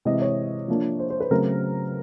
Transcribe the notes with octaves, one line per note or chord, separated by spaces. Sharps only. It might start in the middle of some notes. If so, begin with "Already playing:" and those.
C3 E3 G#3 D#5
C#5
F3 A#3 D4
C5
C5
B4
C#3 F#3 A3 C4 A#4